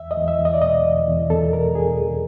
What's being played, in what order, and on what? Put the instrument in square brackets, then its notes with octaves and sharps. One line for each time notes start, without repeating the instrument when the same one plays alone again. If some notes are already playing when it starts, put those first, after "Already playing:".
Already playing: [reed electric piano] E2 E5
D#5
E2
E5
E2
D#5
D5
B2 D#5
E2
E2
E2 A4
B2 A#4
E2 G#4
E2